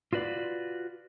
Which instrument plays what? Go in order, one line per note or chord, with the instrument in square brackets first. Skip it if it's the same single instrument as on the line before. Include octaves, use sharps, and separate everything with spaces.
[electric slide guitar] F4 F#4 B4 D5